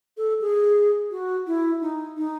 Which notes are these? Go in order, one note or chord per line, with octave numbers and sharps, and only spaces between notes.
A4
G#4
F#4
E4
D#4
D#4